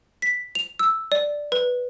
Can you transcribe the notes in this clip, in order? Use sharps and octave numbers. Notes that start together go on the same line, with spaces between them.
B6
F7
E6
D5
B4